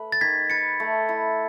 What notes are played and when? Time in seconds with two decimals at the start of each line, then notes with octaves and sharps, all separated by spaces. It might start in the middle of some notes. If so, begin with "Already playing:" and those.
Already playing: A3 B4
0.12 A6
0.21 D#3 G#6 B6
0.50 B4 A6 C#7
0.80 A3
1.09 E4